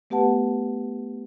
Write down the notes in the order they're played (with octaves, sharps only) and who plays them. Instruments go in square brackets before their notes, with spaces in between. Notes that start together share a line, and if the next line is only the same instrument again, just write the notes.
[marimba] A3 B3 G4 B4 F#5 A5